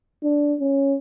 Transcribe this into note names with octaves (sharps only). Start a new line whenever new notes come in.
D4
C#4